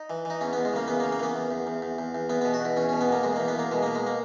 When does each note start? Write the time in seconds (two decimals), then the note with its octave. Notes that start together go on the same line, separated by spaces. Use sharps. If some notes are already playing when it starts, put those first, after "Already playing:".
Already playing: D#4
0.10 E3
0.25 E3 D#4
0.41 E2 C#4
0.53 E2 B3
0.65 G#3
0.73 C#3 A#3
0.88 E2 B3
1.00 A#3
1.04 C#3
1.12 A#3
1.20 E3 B3
1.36 E2
1.51 E2
1.67 E2
1.82 E2
1.99 E2
2.15 E2
2.29 E2 B3
2.41 B2 B3
2.54 F#4
2.61 E2 E4
2.76 E2 C#4
2.89 B2 C#4
3.01 B3
3.08 B2 A#3
3.23 E2 G#3
3.36 E2 A#3
3.48 B3
3.55 E2 A#3
3.71 B2 G#3
3.83 B2 A#3
3.95 G#3
4.07 A#3